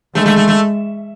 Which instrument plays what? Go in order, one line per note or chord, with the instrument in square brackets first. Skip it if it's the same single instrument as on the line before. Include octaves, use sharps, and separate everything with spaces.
[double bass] G#3 [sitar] A3
[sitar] A3
A3
A3